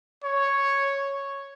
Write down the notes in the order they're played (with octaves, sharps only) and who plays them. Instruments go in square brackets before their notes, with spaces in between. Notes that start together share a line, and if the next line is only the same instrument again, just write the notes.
[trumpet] C#5